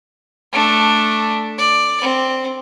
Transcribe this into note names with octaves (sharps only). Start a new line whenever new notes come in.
A3 D4
D5
C4